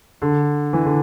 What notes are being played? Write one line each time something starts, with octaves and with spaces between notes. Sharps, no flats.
D3
E3
D3